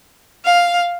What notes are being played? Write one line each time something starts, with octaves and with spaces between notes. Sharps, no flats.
F5